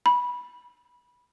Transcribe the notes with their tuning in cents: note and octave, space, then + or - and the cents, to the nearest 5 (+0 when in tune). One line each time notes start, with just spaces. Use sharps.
B5 -15